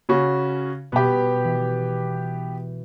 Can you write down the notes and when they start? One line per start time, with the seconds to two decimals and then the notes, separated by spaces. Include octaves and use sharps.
0.09 C#3 C#4 F#4
0.92 B2 G3 B3 G4
1.44 E3